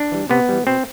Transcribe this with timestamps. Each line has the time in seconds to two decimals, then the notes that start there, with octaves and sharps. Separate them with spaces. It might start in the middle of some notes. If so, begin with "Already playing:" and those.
Already playing: D4
0.12 E3 G3
0.29 C3 B3
0.49 E3 G3
0.67 B2 C4